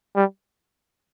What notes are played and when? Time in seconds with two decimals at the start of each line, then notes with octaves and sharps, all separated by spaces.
0.15 G3